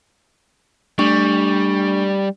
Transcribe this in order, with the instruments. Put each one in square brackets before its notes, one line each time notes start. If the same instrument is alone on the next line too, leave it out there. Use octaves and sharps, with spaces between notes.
[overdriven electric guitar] G3 [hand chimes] A3 D4 C#6